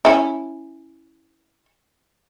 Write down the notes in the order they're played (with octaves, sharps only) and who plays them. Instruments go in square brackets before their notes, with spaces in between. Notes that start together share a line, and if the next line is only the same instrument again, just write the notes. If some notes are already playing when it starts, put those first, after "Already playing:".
[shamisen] C#4 E4